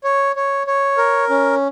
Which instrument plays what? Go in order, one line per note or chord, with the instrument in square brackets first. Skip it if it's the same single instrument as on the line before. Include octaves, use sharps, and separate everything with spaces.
[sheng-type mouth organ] C#5
C#5
C#5
A#4
C#4